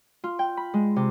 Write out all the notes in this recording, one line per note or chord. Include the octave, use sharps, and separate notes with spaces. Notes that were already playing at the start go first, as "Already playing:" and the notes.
F4
G5
B5
G#3
C3